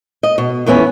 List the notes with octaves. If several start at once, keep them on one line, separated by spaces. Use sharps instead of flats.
D#5
B2
F2 E3 B3 C#4